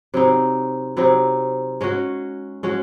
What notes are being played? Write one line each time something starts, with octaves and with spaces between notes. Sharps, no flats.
C3 F#3 C4 D#4
C3 F#3 C4 D#4
G#3 C#4 F#4
G#3 C#4 F#4